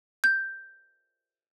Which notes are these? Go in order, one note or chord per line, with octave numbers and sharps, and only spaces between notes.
G6